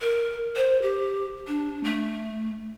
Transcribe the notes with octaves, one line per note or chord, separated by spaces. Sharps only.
A#4
C5
G4
D4
A3